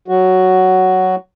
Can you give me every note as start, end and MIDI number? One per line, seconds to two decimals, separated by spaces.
0.08 1.15 54
0.08 1.15 66